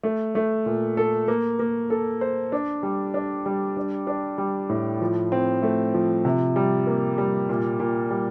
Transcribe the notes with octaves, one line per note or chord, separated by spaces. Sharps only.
A3
A3
A#2
A4
A#3
A#3
A4
C5
D4
G3
D4
G3
D4
D4
G3
A2
F3
C4
A3
F3
C3
G3
A#3
G3
A#2
A#2
G3